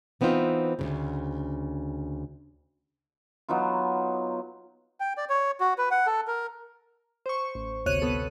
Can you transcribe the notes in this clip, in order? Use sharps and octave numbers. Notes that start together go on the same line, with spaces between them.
E3 B3 C4 D#4 F4
D2 A#2 C#3
F#3 B3 D#4 F4
G5
D5
C#5
F#4
B4
F#5
A4
A#4
C5 C#6
A1
G1 D2 C3 C#5 F#6 D#7
B3 A4